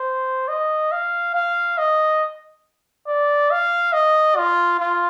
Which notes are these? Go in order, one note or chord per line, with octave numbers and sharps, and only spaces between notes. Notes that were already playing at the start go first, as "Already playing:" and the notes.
Already playing: C5
D#5
F5
F5
D#5
D5
F5
D#5
F4
F4